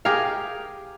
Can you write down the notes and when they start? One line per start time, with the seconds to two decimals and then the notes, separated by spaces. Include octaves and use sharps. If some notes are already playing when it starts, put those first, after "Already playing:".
0.05 G4 G#4 A#4 F5